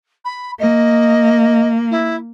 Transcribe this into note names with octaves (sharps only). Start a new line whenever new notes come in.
B5
A#3 D#5
E4